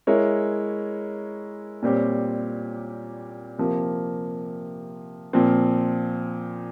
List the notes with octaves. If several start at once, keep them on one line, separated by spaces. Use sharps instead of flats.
G#3 E4 A#4 C#5
A#2 G3 C4 G4 C#5
C3 F3 A#3
A#2 F3 C4